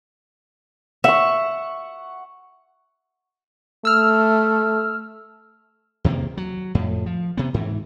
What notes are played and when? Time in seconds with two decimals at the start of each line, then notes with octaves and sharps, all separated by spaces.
1.04 E5 F#5 C#6
3.85 A3 E6 F6
6.04 E2 C3 D#3 A#3
6.37 F#3
6.75 F2 A2
7.06 F3
7.37 C3 B3
7.54 G#2 E3